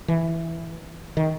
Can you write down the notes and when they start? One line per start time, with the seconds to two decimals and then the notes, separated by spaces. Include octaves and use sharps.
0.08 E3
1.17 D#3